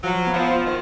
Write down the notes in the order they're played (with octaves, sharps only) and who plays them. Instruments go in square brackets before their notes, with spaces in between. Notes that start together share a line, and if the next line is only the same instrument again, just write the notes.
[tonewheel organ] F3 [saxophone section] F#3
[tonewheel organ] B3
[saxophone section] F3
[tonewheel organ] F4
[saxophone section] D#3